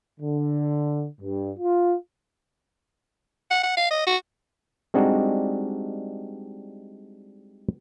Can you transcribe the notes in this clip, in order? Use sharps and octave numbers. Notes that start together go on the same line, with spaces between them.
D3
G2
F4
F#5
F#5
F5
D#5
F#4
G3 G#3 C4 D4 D#4 F#4